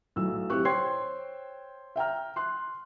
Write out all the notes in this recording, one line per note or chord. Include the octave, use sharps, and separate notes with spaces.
B1 A2 F#3 E6
C4 E4 G4 C#6 F#6
C5 C#5 G5 C6 G#6 C7
E5 G5 A#5 F6
C6 F#6